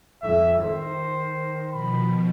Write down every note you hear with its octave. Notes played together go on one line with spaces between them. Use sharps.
F2 E5
D#3 C5
B2 F3 B5